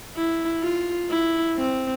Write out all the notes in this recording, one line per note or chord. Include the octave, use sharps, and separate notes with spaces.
E4
F4
E4
C4